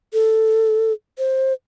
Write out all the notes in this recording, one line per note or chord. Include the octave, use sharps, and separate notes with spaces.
A4
C5